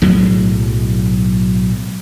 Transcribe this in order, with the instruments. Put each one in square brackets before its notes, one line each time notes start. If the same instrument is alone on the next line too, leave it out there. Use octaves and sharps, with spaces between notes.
[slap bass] B1 A2 F#3 G#3